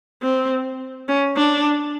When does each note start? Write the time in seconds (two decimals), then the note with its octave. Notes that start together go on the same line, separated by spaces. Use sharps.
0.22 C4
1.08 C#4
1.36 D4